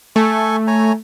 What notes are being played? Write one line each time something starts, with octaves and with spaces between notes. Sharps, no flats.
A3 A4 G#5 C#6
C#5 G#5 A#5